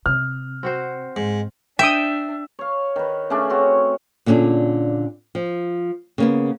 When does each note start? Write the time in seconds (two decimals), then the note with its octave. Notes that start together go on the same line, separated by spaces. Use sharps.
0.06 C3 F6
0.63 C4 F#4 C5
1.16 G#2
1.79 D4 E5 G5 D#6
2.59 C#5 F5
2.96 D#3 B4
3.30 C#3 A3 C#4 D4
3.50 C4 C#4 F#4 C#5
4.26 A#2 D3 C#4 D4 G#4
5.35 F3
6.18 C#3 A#3 B3